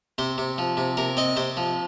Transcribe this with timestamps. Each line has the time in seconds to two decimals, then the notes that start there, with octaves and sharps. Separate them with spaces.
0.18 C3 C5
0.38 C3
0.58 F3
0.77 C3
0.97 C3 A#4
1.17 C4 D#5
1.37 C3 C5
1.57 F3